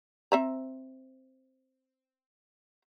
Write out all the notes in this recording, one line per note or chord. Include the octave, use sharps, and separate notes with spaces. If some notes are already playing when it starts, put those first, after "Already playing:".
C4 E5 A#5